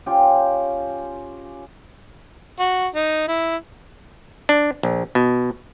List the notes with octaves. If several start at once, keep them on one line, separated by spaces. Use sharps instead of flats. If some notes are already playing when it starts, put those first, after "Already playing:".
C#4 F4 G4
F#4
D#4
E4
D4
A#1
B2